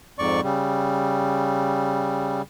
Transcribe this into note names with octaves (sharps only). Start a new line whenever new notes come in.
F2 G#2 D5 C#6
C#3 G3